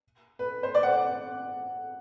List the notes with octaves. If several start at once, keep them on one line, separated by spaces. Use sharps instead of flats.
B4
C5
D5
F#5